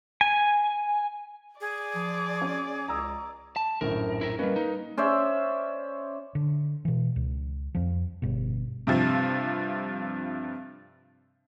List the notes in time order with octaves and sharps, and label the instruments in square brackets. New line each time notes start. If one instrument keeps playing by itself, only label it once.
[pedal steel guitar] G#5
[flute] G#4 [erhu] D5
[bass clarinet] F3
[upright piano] C#4
[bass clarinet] C#2 [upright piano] A#5 D#6 E6
[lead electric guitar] A5
[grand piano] A#1 F#2 A2 [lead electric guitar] A#4
[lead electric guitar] E4 A#4
[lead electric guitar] G3 C#4 [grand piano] A#3 B4 D#5
[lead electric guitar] D#4
[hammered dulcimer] C#4 C5 D5 E5
[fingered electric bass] D3
B2 E3
C#2
F2 F3
G1 B2
[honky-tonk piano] G2 C3 F3